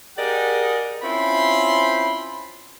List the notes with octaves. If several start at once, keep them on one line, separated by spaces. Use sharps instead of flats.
G4 G#4 A#4 D5 D#5 F#5
C4 C#4 E4 F4 B5 C6